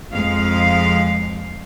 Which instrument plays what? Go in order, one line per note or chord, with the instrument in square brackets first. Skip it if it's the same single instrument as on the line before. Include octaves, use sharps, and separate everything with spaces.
[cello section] F2 G#3 F5